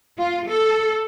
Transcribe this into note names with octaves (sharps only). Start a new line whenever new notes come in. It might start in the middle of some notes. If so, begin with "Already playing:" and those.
F4
A4